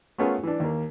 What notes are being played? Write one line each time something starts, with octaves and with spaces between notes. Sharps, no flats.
A3 B3 C#4 F4 G#4 A#4
E3 D4
D#2 A#3